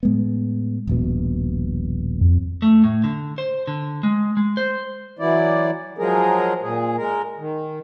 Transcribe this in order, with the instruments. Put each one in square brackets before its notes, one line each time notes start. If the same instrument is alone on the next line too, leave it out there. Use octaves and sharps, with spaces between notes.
[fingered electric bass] A2 G#3 B3
D#1 A#1 B2
[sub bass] F2
[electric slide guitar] A3
A2
D3
C5
D3
G#3
G#3
C5
[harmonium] E3 F#3 E4 D5
F3 F#3 G#3 G#4 A#4
A#2 G#4
G#3 A#4
D#3